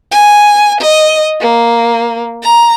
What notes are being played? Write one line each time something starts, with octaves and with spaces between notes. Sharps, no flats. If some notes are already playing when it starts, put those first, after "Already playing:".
G#5
D#5
A#3
A#5